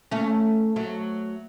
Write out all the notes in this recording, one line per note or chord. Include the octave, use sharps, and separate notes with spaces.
A3 C#4
F#3 A3